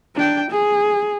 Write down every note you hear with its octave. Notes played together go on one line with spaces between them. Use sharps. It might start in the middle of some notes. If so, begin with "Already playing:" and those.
D4 G5
G#4